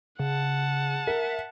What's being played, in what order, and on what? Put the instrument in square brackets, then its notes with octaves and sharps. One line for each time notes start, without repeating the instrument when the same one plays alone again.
[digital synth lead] C#3 [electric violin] F#5 A5
[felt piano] A#4 [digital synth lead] E5